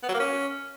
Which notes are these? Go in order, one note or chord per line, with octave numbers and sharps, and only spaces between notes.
B3
F#3
A#3
C#4